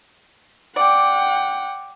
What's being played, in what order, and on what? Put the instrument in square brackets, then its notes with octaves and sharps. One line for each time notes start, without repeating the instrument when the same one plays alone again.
[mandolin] D5 [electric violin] F#5 G5